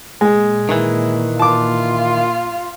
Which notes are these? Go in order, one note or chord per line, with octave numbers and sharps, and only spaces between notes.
A#2 G#3
D#3 E3
F4 A5 D6